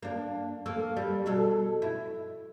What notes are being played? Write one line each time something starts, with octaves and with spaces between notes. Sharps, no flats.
A#3 D4
A#3 A4
G3
B2 G#4 A4
E4